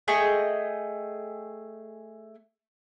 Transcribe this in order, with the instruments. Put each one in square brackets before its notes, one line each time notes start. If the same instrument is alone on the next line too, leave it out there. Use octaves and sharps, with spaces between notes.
[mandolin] A3 G#4 D#5 G5